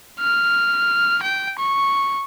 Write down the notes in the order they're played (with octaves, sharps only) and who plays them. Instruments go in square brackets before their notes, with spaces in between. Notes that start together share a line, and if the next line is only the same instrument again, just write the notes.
[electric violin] F6
G5
C#6